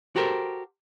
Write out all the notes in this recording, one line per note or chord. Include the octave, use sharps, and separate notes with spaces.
F#4 G4 A4 A#4 C5